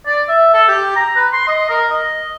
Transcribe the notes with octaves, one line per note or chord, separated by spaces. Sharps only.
D5
E5
A4
G4
A#5
B4
C6
D#5
A#4
D#5